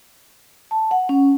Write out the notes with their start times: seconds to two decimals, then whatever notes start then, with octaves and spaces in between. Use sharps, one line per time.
0.71 A5
0.91 F#5
1.09 C#4